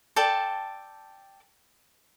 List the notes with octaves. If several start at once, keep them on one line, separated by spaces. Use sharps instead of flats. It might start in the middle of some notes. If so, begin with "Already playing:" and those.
A4 D5 G5 A5